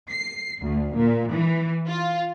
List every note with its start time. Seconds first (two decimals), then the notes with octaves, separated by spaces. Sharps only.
0.10 C7
0.62 D2
0.96 A#2
1.32 E3
1.87 F4